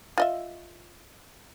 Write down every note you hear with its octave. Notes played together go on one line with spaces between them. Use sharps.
F4 D#5 E5